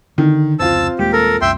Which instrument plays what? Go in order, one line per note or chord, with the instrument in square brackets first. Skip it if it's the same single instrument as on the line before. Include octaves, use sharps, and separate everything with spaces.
[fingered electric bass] D3 [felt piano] D#3
[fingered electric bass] F1 C#2 [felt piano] C4 F4 [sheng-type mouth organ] A5 E6
[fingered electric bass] D#1 G#3 A#3 [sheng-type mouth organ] G4
[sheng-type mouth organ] A4 A#4
[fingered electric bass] C2 F#2 [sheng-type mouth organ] E5 G5 C6